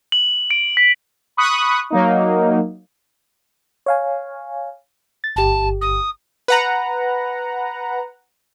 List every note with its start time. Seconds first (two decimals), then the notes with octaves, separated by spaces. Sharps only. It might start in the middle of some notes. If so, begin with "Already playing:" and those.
0.12 F#7
0.51 D7
0.77 B6
1.37 B5 C#6 D#6 F#6
1.90 F#3 A#3 D#4
3.86 C#5 F5 G#5
5.24 A6
5.36 G1 G4 A5
5.81 D#6
6.48 B4 F#5 A#5